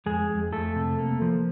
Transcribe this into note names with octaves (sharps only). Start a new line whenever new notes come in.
F2 G#3 G#4
F2
F2 A3 A4
C3
A#3
F3